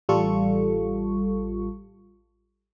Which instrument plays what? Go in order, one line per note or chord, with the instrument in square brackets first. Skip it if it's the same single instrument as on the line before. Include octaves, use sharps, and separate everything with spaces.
[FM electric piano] A1 G3 F4 A4 C#6